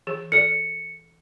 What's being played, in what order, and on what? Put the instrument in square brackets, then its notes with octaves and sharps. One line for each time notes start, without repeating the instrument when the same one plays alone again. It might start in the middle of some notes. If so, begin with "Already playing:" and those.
[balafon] E3 G#4
[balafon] A4 D5 [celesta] C#7